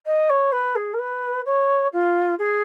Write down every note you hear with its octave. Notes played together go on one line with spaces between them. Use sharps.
D#5
C#5
B4
G#4
A#4
B4
C#5
F4
G#4